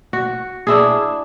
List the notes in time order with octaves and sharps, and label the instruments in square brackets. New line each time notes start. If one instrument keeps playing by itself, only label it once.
[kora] F#4
D4 E4 G#4